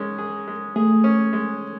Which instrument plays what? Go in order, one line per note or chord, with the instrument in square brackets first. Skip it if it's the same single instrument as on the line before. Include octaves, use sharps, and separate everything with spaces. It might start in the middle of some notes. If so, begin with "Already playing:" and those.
Already playing: [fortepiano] G#2 G#3 C#4
G#4
G#3
[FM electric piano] A3 [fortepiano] G#4
[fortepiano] C#4
G#3